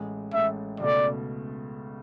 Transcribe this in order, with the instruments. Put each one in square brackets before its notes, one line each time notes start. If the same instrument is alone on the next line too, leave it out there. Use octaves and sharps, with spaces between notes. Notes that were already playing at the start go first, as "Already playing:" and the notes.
Already playing: [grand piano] A1 A2 G#3
[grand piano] A1 A2 G#3 [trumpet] E5
[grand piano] C#2 B2 A3 [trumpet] D5